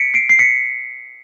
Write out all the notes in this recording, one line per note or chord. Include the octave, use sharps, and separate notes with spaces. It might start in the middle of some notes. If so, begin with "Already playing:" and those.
Already playing: B6 C#7 D7
C7 D7
C7
B6 C#7